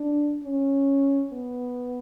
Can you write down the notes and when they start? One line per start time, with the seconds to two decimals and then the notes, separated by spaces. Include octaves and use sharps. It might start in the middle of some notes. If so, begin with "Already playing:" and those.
Already playing: D4
0.43 C#4
1.33 B3